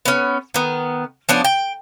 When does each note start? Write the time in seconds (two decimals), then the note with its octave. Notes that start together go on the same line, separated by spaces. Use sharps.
0.05 B3 C#4
0.54 D#3 B3
1.29 F3 B3 C#4 D4
1.45 G5